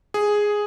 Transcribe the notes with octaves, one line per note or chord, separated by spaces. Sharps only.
G#4